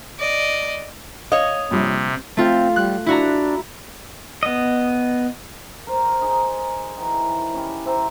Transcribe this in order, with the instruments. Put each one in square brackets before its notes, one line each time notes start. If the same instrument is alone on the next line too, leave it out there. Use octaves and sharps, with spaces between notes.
[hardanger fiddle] D5 D#5
[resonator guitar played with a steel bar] C#5 D#5 [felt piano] F5 [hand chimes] D#6
[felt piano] A#1 G3 [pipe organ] C3
[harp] A3 F4 [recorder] C4
[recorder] G3 [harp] F#6
[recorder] D4 [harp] E4 F#4 A#5
[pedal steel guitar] B3 D#5
[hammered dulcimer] A#4 C5 D5
D#4 G#4
D#3 E3
C#4 G4 B5
C5 E5 G5 A#5